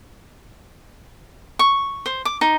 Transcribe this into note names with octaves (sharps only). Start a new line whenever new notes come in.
C#6
C5
D6
D#4